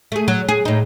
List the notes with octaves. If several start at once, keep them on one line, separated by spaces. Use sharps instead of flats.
A3 G#4
F#3
G#4
A2 D#4